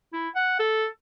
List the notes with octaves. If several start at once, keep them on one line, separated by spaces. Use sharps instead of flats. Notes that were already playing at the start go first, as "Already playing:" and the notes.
E4
F#5
A4